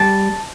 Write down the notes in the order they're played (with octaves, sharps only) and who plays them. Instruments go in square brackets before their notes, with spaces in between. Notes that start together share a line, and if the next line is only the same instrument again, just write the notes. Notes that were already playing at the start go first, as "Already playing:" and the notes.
Already playing: [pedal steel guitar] G3 A5